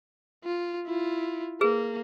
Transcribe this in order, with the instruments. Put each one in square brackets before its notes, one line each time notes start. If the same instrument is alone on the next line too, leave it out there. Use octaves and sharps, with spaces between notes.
[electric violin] F4
E4 F4
[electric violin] A#3 [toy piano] G#4 B4